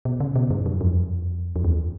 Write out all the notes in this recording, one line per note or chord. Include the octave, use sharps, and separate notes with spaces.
B2
C#3
B2
G2
F#2
F2
F2
E2